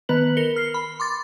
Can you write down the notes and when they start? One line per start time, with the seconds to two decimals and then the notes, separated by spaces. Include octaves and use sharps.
0.09 D#3 B3 B4 F#7
0.37 A#4 C#7 G7
0.56 F6 C7
0.74 B5
1.00 C6 D6 A6